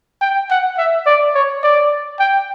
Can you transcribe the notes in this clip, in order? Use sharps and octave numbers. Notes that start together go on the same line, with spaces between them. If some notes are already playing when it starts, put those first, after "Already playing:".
G5
F#5
E5
D5
C#5
D5
G5